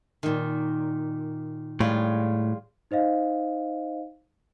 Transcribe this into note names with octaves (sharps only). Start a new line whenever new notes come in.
A#2 D#3
A2 G3 G#3 F4
D#4 C5 D#5 F5